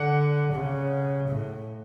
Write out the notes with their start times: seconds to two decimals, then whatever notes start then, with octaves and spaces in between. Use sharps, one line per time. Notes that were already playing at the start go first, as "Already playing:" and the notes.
Already playing: D3 F#5
0.51 C#3
1.28 A2